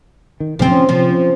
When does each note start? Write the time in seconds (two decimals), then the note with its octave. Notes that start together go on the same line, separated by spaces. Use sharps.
0.40 D#3
0.59 F#1 E2 C#3 F3 C4
0.71 C#4
0.89 C3 F3
1.10 C#4